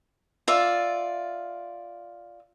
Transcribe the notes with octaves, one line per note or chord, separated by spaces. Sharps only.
F4 D5 E5